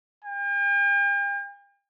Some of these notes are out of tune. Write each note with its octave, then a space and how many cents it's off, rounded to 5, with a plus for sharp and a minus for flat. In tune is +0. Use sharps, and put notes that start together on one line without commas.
G5 +45